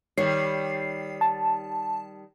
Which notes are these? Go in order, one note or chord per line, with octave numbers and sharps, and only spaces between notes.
D#3 G3 C#5 C7
A5